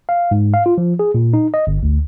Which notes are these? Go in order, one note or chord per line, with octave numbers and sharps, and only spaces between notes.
F5
G#2
F5
F4
F3
G#4
A#2
D#4
D#5
G1
D2